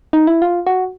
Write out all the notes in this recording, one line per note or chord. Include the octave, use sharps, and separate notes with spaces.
D#4
E4
F4
F#4